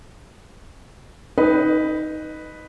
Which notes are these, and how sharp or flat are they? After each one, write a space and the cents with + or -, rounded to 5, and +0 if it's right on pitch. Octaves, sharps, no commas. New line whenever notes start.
D#4 +10 B4 +0 D#5 -25